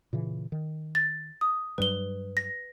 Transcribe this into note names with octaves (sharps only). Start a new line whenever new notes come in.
A#2 C#3 E3
D#3
A6
D#6
G2 F#3 G3 B4 G7
A#6